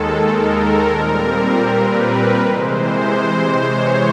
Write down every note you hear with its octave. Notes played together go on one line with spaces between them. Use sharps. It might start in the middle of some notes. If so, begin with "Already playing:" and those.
Already playing: D#2 D#3 G#3 A4
A#4
A#2 G3 C4 A#4
B4
C3 E3 G#3 C5
C5
C#5